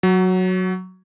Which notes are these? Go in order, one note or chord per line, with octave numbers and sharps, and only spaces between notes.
F#3